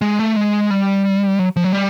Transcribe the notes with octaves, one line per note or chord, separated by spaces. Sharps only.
G#3
A3
G#3
G3
F#3
F3
F#3
G3